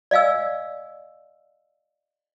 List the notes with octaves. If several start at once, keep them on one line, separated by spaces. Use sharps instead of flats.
D5 D#5 F5 G#5 E6